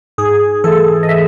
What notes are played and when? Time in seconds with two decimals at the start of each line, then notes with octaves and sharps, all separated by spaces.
0.18 G#2 G#4
0.64 E3 A3 A4
1.03 D#5
1.09 E5